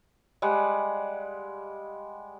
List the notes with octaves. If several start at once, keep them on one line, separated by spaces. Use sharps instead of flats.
G3 G#3 F5 F#5